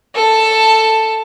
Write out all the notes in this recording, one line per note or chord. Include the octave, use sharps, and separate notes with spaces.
A4 A5